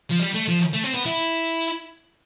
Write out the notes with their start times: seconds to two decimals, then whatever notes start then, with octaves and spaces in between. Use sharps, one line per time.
0.10 F3
0.20 G3
0.34 A3
0.49 F3
0.74 A3
0.84 C4
0.94 B3
1.06 E4